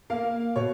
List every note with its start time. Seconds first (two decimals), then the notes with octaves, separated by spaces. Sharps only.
0.10 A#3 F5
0.56 B2 C#5